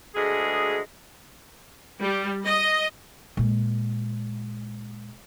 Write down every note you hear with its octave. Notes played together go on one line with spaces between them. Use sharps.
D2 G#3 G#4
G3
D#5
A#2 G#3